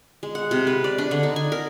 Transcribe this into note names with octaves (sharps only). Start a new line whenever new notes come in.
G#3
F#5
C3
B4
D5
D4
D3
D#4
G#5
A#4